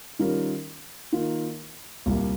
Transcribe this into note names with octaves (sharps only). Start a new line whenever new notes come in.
D#3 G3 C#4 F4 A#4
D#3 A#3 F4 A#4
C2 A#2 G3 A#3